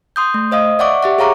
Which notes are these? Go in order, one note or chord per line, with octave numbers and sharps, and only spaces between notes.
C6 D#6 G6
A3
C5 D#5 F5 D#6
D5 E5 F#5 C#6 D6
G4 E5 F#5
G#4 C#5 F5 A#5 C#6 D6